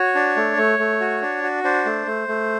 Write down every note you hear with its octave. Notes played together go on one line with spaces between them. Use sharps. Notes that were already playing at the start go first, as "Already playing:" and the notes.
Already playing: F#4 C#5
D4
A3
A3
A3
F#4
D4
F#4
D4 C5
A3
A3
A3